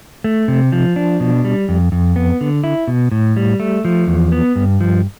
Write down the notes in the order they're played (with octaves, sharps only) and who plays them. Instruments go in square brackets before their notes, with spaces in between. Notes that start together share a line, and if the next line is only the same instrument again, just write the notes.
[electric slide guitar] A3
C3
F3
D4
B2
G3
F2
F2
B3
D3
E4
B2
A2
G3
A3
F3
E2
B3
G2
F3